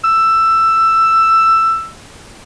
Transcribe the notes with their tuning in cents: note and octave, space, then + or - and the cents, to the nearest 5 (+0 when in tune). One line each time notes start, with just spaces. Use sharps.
E6 +10